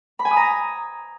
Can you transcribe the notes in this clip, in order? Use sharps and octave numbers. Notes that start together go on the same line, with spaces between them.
B5
G#5
D#6
A#5